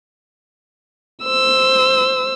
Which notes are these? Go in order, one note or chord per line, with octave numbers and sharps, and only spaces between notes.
C5 E6